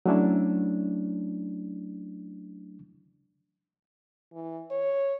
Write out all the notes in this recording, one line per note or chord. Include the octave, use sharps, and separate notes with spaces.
F#3 A3 C#4 D4 E4
E3
C#5